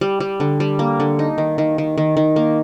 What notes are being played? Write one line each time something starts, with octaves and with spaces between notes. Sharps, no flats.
G3
G3
D3
G3
A#3
D3
D#4
D#3
D#3
D#3
D#3
D#3
A#3